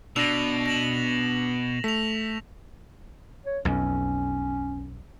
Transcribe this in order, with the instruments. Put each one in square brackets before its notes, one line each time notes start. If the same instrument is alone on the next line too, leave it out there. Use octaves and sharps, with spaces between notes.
[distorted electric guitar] B2 [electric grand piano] D4 E6 [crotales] A#6 F7
[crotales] A#6 E7 F#7
[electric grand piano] A3 [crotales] B6 F7
[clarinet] C#5
[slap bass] B1 F2 [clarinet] C#4